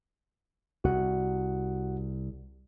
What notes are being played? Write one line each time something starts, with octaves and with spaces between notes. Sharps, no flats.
C2 F#4 F#5